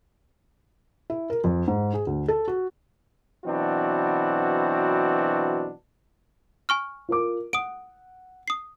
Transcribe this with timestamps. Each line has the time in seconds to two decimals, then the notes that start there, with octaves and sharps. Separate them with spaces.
1.10 E4
1.30 A#4
1.44 F2
1.68 G#2
1.94 G#4
2.07 D2
2.28 A4
2.48 F#4
3.45 B2 E3 F#3 C4 D4 F#4
6.69 G#5 C#6 F6
7.09 F4 A#4 D6
7.53 F#5 D#6 D7
8.48 D#6 C7